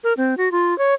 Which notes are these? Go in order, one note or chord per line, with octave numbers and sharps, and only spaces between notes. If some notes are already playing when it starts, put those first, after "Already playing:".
A#4
C4
F#4
F4
C#5